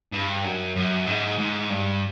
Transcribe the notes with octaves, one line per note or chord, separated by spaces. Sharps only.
G2
F#2
F#2
G#2
G#2
G2